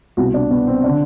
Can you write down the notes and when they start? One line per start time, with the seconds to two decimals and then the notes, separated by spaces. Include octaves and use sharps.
0.17 C2 B2 F#4
0.34 D4
0.51 B3
0.67 C4
0.84 D3 D4